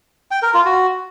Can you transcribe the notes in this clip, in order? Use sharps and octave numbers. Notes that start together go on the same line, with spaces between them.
G5
A#4
F4
F#4